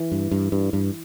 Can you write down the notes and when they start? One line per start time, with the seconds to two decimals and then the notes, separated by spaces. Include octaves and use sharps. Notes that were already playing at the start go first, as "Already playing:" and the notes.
Already playing: E3
0.12 G2
0.31 G2
0.52 G2
0.73 G2